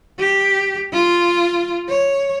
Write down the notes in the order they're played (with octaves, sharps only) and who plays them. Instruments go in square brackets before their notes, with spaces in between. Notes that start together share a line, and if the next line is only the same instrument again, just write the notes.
[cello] G4
F4
C#5